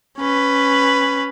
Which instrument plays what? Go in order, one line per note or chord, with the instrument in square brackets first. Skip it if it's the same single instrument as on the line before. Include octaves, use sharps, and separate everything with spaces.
[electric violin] C#4 B4